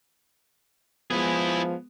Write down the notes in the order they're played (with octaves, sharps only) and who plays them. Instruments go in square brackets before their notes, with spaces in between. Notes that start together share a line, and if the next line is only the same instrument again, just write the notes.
[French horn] F3 [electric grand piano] G#3 B3 [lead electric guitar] E4 G#4